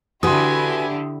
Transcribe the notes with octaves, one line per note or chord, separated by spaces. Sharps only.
D3 E4 F#4 G4 B4 G#5 C6 D#6